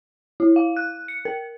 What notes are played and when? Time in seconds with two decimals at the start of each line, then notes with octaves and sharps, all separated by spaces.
0.40 E4
0.56 F5
0.77 F#6
1.08 C#7
1.25 A#4